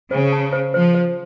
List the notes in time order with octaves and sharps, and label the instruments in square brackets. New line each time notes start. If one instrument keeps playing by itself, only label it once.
[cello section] C#3 [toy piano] C5
[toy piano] A5
C5
[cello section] F3 [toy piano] C5
[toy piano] C5